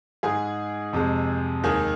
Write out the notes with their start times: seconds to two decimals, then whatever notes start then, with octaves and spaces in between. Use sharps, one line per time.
0.23 G#2 G#3 G#4
0.93 F2 C3 G#3
1.64 D#2 D#3 G#3 G#4